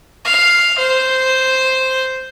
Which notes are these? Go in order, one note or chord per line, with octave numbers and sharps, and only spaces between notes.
F5
C5